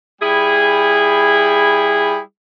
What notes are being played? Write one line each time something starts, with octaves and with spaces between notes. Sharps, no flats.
G3 E4 G#4